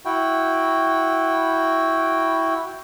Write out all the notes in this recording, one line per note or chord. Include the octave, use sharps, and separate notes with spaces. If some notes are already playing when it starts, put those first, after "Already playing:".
E4 F#4 G5